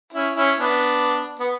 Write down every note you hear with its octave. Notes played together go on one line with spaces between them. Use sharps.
C#4 E4
C#4 E4
B3 D4
B3